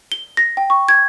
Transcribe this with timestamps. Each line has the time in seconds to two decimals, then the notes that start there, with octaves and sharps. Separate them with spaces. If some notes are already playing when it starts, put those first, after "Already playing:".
0.12 G7
0.37 A#6
0.57 G5
0.70 C#6
0.89 G#6